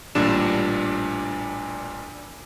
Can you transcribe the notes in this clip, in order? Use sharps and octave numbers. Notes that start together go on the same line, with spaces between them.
A1 A#2 G3 D4 E7